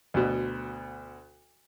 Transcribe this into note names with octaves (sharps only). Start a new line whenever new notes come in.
D2 B2